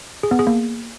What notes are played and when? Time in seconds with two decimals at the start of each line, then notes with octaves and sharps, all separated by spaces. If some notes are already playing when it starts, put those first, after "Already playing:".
0.23 G#4
0.31 B3
0.39 G#4
0.47 A#3